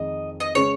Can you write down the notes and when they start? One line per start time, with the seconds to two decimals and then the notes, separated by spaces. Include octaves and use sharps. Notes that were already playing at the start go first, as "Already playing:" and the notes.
Already playing: F2 D#3 G#3 D#5
0.40 D#5
0.55 C#3 G#3 C#4 G#4 C#5